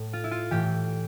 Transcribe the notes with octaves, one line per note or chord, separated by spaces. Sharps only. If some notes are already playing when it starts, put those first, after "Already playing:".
Already playing: A2
F4
E4
F4
A2 E3 G4